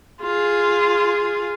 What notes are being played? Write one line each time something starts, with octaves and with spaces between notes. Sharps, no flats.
F4 G#4